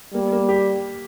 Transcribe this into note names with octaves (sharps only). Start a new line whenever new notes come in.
G3 A#3
A#3
G4